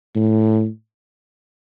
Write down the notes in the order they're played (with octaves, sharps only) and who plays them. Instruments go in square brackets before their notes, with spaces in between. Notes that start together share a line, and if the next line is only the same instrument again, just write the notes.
[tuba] A2